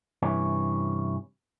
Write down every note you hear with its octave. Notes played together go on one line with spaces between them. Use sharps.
G2 C3 E3 C#4